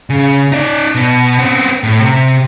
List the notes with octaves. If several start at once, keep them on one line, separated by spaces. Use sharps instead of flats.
C#3
D#4 D5
B2
B3 C4
A2
C3